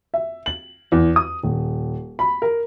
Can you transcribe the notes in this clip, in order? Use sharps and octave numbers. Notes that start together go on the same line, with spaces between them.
E5
F#7
E2
D#6
D#1
B5
A#4